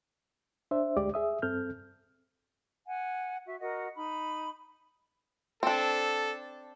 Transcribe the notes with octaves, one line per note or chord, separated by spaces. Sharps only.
D4 C5 E5
D2 G#3 G4 D5 D6
G#4 E5 D#6
G2 C4 A4 F6 G6
F#5 G#5
F#4 E5
F#4 A#4 D#5 F#5
D#4 B5
C4 D4 A4